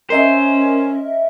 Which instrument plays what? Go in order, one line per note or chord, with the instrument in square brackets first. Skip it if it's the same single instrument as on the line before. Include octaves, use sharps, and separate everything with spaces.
[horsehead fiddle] C#4 [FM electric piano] A#4 D#5 E5 [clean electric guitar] C5